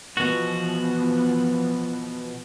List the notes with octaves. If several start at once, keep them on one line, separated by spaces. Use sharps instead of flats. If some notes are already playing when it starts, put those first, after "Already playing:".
B2 E3 F3 B3 F#4